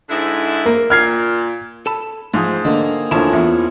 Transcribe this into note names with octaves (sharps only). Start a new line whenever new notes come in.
G#2 D3 E4
A#3
A#2 F6 G#6 C7
A4 A5 B5
G#2 F3 A3 D#4 G#4 C5
D3 D#3 A#3
D2 D3 F3 C#4 E4 C#5 A5
E2